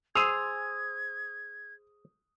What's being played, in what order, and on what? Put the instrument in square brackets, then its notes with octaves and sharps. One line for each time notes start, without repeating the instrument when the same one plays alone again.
[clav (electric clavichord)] G#4 C5 [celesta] C6 E6 F7 [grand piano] D#6 [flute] G#6